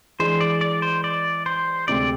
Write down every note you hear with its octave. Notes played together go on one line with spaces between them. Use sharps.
E3 G#3 D4 G#4 C5
D5
D5
C5
D5
C5
D2 C3 G#3 D5